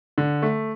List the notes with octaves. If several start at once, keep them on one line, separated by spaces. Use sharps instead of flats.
D3
A3